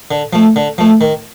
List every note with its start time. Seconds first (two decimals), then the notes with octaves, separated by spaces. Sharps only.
0.11 D3
0.33 F3 A3
0.56 D3
0.78 F3 A3
1.01 D#3